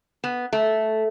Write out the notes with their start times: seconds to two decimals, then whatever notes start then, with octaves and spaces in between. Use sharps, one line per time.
0.24 B3
0.53 A3